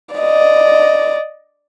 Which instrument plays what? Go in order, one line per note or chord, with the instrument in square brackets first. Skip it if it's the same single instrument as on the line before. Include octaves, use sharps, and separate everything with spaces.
[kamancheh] D5 D#5